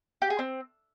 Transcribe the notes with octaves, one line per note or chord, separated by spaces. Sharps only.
G4
G#4
C4